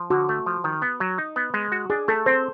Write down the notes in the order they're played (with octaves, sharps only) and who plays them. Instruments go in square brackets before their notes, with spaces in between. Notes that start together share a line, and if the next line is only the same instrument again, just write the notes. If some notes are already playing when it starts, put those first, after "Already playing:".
Already playing: [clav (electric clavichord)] F3
[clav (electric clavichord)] D3 [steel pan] F#4
[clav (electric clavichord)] A3
F3
D#3
B3
F#3
D#4
B3
G#3
F#4
[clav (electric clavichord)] D4 [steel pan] G#4
[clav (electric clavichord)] A3 [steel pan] A4
[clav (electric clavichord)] C4 [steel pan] C5